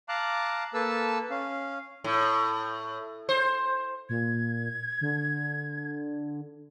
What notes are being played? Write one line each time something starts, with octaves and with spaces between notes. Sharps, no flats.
F5 A5 A#5 D6 F#6
A#3 A4 B4 A5 E6
C#4 F5
A2
C5
A#2 G#6
D3